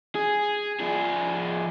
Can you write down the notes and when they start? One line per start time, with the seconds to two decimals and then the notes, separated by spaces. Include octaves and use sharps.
0.15 G#4
0.80 F3 G#4